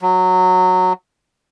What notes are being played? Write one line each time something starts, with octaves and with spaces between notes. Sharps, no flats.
F#3